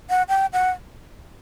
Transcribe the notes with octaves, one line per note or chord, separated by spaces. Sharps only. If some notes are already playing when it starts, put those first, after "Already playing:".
F#5
G5
F#5